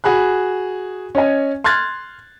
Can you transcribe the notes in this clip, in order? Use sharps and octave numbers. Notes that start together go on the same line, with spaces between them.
F#4 G#4 B5 F#6
C#4 C#5 D#5 G#5
C6 F6 F#6 G#6 A6